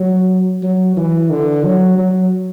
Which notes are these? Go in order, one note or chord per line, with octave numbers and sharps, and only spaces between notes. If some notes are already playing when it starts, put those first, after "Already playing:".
Already playing: F#3
F#3
E3
D3
F#3
F#3